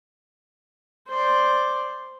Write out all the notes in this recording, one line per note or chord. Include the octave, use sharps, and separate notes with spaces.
C5 D5